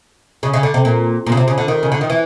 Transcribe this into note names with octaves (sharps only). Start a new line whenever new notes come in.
C#3
C#3
D3
C3
A#2
A#2
C#3
C3
C#3
D3
D#3
C#3
D3
D#3
E3